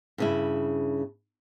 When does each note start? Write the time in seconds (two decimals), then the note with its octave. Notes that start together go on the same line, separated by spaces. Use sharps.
0.18 G2 C#3 E4